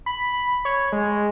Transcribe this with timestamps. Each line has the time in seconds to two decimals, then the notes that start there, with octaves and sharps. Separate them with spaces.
0.06 B5
0.65 C#5
0.92 G#3